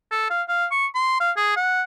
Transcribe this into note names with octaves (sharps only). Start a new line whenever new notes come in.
A4
F5
F5
C#6
C6
F5
G#4
F#5